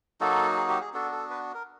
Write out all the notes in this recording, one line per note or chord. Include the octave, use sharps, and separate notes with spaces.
F#3 A#3 D#4 F#4 A4
G#4
G4
G#4
B3 D4 F#4 A4
A4
B4
A#4